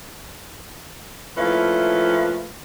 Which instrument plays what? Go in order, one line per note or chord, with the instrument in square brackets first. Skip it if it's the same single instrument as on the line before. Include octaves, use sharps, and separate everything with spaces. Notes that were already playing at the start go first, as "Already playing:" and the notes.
[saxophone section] A#2 F3 A3 C#4 E4 B4